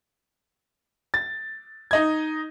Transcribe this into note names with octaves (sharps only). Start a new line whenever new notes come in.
A6
D#4 D#5 G#6